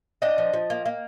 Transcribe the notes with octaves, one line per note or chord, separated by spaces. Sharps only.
D4 D#5 G5
F3
F3
A#3
A#3